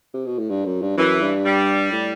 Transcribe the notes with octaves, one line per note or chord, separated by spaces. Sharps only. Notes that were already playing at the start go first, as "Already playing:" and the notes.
C3
B2
A2
G2
F#2
G2
F#2 E3
G2
G3
A2